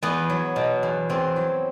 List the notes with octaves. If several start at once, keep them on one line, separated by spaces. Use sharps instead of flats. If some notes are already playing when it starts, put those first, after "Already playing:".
E2 B3
F#3
B2
E2
E2 C4
F#3